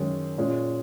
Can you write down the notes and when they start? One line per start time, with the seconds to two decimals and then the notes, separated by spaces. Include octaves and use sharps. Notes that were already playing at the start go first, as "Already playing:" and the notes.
Already playing: F#2 D#3 G#3 C#4
0.38 A#2 G#3 C#4